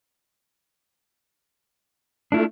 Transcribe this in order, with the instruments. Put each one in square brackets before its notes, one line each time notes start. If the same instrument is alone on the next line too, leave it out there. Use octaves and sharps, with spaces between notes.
[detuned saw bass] A3 [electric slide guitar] D4 E4 F4